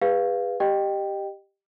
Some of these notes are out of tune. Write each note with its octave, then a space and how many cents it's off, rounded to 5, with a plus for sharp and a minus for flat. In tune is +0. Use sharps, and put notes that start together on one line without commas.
G#4 -40 B4 +0 F5 +0
G4 +0 D#5 -25 G5 +0